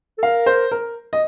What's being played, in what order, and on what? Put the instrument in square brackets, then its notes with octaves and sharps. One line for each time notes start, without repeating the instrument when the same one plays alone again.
[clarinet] A4
[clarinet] A#4 [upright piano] F5
[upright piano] C5
A#4
D#5